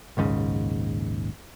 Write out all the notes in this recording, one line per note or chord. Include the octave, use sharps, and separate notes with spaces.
A#1 D#2 G#2 C#3